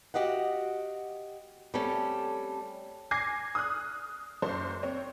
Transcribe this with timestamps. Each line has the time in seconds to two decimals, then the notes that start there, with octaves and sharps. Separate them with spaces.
0.14 F#4 G4 D#5 F5 F#5
1.74 G3 A3 C4 C#4 A4
3.11 G#5 D6 G#6 A#6 C7
3.55 D#6 F6 F#6
4.42 F#1 F#2 C5
4.83 C4 C#5